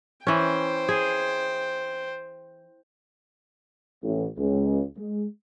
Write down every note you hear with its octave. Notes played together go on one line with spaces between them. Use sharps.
E3 C#4 C5 G5
G#4
A1
C#2
G#3